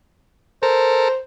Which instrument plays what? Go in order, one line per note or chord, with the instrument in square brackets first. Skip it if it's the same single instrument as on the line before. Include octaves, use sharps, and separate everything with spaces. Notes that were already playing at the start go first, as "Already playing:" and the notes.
[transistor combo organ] A4 A#4 [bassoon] C5